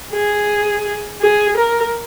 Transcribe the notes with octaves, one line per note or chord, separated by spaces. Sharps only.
G#4
G#4
A#4